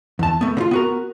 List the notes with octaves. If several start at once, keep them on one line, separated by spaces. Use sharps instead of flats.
E2 A5
A3 B3
D3 F4
B3 F#4 A#4